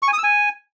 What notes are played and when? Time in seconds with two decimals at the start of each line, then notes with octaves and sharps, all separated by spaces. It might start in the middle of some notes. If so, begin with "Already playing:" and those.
0.03 C#6
0.08 G#5
0.13 D#6
0.18 E6
0.23 G#5